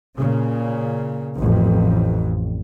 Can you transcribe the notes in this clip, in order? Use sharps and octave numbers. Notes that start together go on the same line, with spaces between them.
A#2 C#3
A1 F2